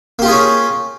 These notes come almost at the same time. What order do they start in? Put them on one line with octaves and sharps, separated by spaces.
A#3 G4 F4 G#4 C#4